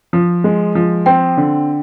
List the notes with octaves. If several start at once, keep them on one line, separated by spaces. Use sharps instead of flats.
F3
G#3
F3
C4 G5
D3